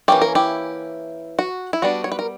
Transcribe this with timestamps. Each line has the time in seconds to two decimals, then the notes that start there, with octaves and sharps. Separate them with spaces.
0.08 E3 A#3 C#4 G4
0.22 A#4
0.35 E4 G4
1.39 F#4
1.73 E4
1.82 G3 B3 D4 F#4
2.04 C#5
2.12 B4
2.19 A#4